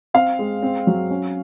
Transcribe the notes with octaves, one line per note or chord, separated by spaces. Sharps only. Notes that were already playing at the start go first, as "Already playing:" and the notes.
C4 F5
G#3
C4
F#3
C#4